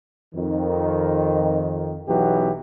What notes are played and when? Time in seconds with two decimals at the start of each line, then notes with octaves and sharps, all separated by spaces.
0.35 F2 D#3
2.07 B1 E3 F#3 B3 G4